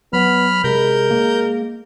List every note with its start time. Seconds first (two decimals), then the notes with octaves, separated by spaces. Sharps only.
0.13 F#3 B3 B5 F6
0.64 C3 G#3 A#4 G6
1.11 A#3